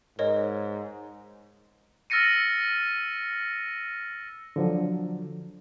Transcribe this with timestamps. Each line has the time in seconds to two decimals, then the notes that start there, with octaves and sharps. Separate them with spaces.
0.19 G#2 A#4 C#5 D#5
2.10 E6 F6 A6 A#6 C#7 D#7
4.56 D3 F3 F#3